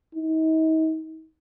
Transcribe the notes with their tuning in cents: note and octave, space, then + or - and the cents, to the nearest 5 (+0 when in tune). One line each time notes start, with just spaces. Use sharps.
D#4 +40